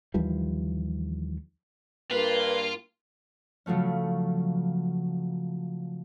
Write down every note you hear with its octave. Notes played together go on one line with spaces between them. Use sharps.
D#2 E3 F3 G3
G2 A#3 F4 B4
C#3 F3 F#3 A3 C#4